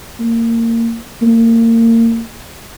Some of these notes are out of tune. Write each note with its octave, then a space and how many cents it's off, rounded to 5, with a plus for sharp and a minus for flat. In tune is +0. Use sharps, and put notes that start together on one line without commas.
A#3 -25
A#3 -30